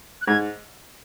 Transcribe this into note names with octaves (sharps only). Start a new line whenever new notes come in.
F#6
G#2 G#6